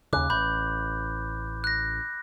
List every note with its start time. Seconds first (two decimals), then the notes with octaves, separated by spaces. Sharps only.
0.13 D#2 C#3 D6 F#6
0.30 A1 B5 G6
1.64 F#6 A#6